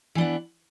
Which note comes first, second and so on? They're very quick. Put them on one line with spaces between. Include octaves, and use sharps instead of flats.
E3 D4 B3